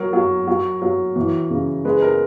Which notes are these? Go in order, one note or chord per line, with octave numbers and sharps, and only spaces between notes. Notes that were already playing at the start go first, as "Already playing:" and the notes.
Already playing: F#3 A#4
F#3
F#3
F#3
E3
C#3
G#3 B4
A#4